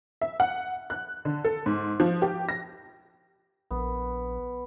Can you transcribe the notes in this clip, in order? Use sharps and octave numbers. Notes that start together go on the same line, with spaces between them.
E5
F#5
F#6
D3
A4
G#2
F3
G4
A#6
A#1 B3